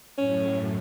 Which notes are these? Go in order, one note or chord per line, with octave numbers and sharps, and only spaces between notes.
F#2 A2 C#4